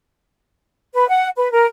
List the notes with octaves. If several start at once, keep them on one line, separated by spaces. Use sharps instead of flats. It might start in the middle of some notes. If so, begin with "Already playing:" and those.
B4
F#5
B4
A#4